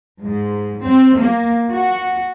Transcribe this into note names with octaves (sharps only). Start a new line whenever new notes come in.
G#2
C4
A#3
F#4